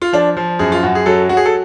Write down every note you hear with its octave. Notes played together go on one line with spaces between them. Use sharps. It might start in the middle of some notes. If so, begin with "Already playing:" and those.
F4
F3 D4
F3
F#2 G#4
F4
F#2 F#4
G#4
F#3 A4
F#3 F#4
G#4
A4